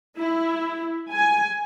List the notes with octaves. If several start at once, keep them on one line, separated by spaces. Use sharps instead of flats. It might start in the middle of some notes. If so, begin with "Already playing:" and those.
E4
G#5